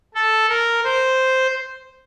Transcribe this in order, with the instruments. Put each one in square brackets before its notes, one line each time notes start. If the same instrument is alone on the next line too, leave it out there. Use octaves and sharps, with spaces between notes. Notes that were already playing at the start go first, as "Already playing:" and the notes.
[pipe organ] A4
A#4
C5